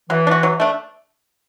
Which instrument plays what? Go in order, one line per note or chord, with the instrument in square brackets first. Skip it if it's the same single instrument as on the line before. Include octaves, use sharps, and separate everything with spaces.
[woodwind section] E3 [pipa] F#3
[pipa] D4
F#4
F#3
A3 D4